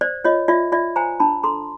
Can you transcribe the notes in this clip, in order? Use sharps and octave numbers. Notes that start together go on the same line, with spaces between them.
C5 D5
F4 C#5 D#5
F4 D5 E5
F4 D5 E5
C5 G#5 A#5
D4 A5 B5
A4 A#5 C6